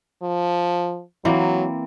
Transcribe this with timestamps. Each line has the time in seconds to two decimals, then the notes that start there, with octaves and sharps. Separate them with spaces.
0.23 F3
1.25 E3 F#3 A#3 C4